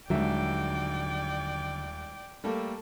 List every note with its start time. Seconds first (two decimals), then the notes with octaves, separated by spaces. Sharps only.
0.10 D#1 D3 D#3 F#3 G#3 D5 E5 G5
2.44 G3 A3 A#3 A4